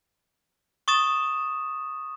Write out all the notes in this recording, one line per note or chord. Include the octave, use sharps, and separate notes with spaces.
C#6 D#6 A6 E7